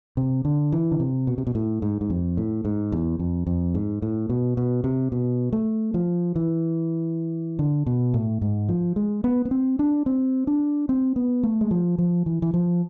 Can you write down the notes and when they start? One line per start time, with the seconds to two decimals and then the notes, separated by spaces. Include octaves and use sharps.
0.17 C3
0.45 D3
0.72 E3
0.91 D3
1.00 C3
1.27 B2
1.38 C3
1.47 B2
1.55 A2
1.82 G#2
2.01 G#2
2.10 F2
2.37 A2
2.65 G#2
2.92 E2
3.19 F2
3.47 F2
3.75 G#2
4.02 A2
4.30 B2
4.57 B2
4.84 C3
5.12 B2
5.53 A3
5.94 F3
6.36 E3
7.59 D3
7.87 B2
8.14 A2
8.42 G#2
8.69 F3
8.96 G#3
9.24 B3
9.45 B3
9.51 C4
9.79 D4
10.06 C4
10.47 D4
10.89 C4
11.16 B3
11.43 A3
11.61 G#3
11.71 F3
11.98 F3
12.26 E3
12.42 E3
12.54 F3